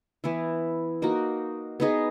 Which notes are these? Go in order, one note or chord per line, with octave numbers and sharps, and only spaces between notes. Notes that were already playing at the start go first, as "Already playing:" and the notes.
E3 B3 E4
A#3 D#4 F#4
B3 D#4 G#4 D#5